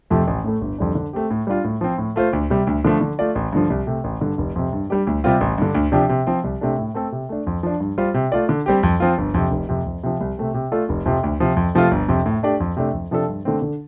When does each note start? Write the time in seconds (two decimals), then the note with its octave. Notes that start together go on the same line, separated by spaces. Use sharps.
0.10 F2 C3 F3 A3
0.27 A1
0.44 A2 A3
0.61 G1
0.79 F2 D3 G3 D4
0.95 D3
1.13 A3 C4 G4
1.30 A2
1.47 G3 D4 F4
1.64 A2
1.81 F3 C4
1.98 A2
2.16 A3 F4 C5
2.33 D2
2.50 C3 G3
2.67 D2
2.85 D3 F3 A3
3.01 D3
3.19 A3 F4 D5
3.35 A1
3.53 G2 D3 F3
3.70 C2
3.87 C3 A3
4.04 A1
4.21 G2 D3
4.38 F1
4.56 F2 C3
4.73 G2
4.90 G3 D4 G4
5.07 D2
5.24 C3 G3 C4 F4
5.41 A1
5.58 G2 D3
5.75 D2
5.92 C3 F3 D4 G4
6.09 C3
6.27 F3 C4
6.44 C2
6.61 C3 A3 D4
6.78 A2
6.94 A3 C4 A4
7.12 C3
7.29 A3 D4
7.47 F2
7.63 F3 D4
7.80 G2
7.98 G3 F4 C5
8.14 C3
8.32 A3 F4 D5
8.49 D3
8.66 G3 C4 G4
8.83 F2
9.00 F3 C4 F4
9.18 G1
9.34 F2 C3
9.51 F1
9.69 F2 C3
9.86 F2
10.03 C3 F3
10.21 C2
10.37 C3 A3 C4
10.54 C3
10.72 A3 F4 A4 D5
10.89 F1
11.05 F2 C3 F3
11.23 D2
11.40 C3 F3
11.57 F2
11.75 C3 F3 A3 F4
11.91 G1
12.08 F2 C3
12.26 A2
12.43 A3 D4 G4 D5
12.60 F2
12.77 C3 A3 D4
12.94 F2
13.11 C3 F3 D4 A4
13.28 G2
13.45 D3 A3 C4
13.62 D3